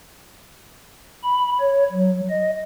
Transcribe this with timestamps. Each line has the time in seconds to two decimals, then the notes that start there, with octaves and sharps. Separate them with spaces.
1.23 B5
1.60 C#5
1.92 F#3
2.30 D#5